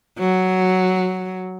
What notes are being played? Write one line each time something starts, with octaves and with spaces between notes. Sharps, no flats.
F#3